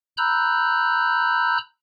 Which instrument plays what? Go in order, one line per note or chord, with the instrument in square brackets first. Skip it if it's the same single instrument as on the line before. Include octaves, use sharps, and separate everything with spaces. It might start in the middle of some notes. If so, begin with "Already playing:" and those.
[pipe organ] A#5 B5 E6 F#6 G6